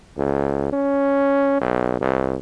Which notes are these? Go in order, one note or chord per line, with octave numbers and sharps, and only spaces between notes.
C#2
C#4
B1
C2